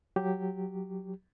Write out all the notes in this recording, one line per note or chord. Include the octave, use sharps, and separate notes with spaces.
F#3 G4